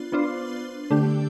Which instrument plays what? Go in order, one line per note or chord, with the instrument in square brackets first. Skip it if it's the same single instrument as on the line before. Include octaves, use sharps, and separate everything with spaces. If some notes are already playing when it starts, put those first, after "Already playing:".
Already playing: [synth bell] B3 D4 F4 C5
B3 D4 F4 C5
D3 A3 D4 G4